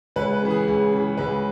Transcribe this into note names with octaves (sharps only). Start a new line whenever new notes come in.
C#2 B4
B4
C#3 E3
G#4
C#2
C#3 E3
C#2 B4